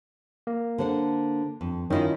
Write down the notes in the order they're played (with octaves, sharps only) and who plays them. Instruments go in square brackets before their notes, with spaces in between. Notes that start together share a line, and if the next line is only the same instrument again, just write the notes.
[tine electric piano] A#3
[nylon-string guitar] D3 C5 F#5
F2
[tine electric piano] D#3 D#5 [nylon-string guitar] C#4 E4 F4